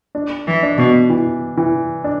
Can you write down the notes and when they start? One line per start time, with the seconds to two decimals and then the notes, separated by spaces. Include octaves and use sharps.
0.15 D4
0.47 E3
0.63 D4
0.78 B2
1.10 E3
1.57 E3
2.04 D4